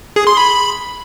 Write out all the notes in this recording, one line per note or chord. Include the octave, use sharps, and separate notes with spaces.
G#4
C6
B5